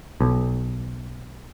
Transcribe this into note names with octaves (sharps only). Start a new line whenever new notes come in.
B1